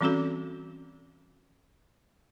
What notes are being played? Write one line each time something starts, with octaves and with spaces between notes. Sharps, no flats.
E3 G3 C4 C#4 F#4 A4